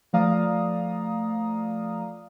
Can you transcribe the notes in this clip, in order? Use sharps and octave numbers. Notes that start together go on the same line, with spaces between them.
F3 A3 D5 F5 A#5 D#6